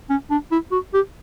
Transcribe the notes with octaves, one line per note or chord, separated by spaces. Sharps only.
C#4
D4
E4
F#4
G4